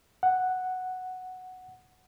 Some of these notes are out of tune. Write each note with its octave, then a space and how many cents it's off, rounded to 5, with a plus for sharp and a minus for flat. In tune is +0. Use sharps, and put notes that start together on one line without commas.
F#5 +0